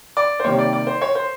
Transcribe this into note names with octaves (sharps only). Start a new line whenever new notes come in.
D5
C5
C3 D#3 G3 A#3 C#5
D5
D5
C5
C#5
C5